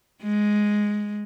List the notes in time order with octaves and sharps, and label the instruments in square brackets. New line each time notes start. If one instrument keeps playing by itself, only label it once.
[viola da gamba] G#3